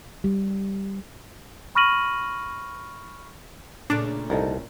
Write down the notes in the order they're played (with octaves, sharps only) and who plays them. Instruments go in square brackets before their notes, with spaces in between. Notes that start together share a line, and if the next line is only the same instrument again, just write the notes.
[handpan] G3
[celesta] B5 C#6 F6 A#6 D#7 F#7
[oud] A#2 C#3 A3 [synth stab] D4
[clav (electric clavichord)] C2 [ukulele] D#4 A4 A#4